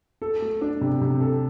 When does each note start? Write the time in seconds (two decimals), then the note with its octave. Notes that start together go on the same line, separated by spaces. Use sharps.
0.22 A4
0.42 A3
0.61 D4
0.81 C3
1.01 C3
1.21 A4